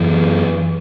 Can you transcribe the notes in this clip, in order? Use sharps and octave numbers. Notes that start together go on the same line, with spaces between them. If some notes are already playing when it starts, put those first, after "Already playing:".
Already playing: F#2 E3